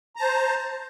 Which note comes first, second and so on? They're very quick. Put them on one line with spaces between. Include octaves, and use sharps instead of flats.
A#5 A5 C5